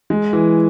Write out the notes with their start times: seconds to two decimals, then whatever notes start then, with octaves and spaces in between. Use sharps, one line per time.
0.10 G#3
0.33 E3